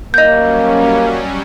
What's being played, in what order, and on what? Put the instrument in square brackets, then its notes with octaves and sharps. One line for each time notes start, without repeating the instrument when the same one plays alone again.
[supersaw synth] F#3 G3 C#4 [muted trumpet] A#3 [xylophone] D#5 G6